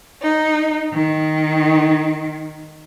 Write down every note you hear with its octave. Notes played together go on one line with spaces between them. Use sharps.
D#4
D#3